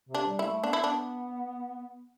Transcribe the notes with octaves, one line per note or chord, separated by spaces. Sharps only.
C3
D4
G3
E4
A3
B3 D4
E4
D4